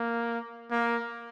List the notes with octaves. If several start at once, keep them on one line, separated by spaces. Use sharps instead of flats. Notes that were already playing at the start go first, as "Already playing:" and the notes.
Already playing: A#3
A#3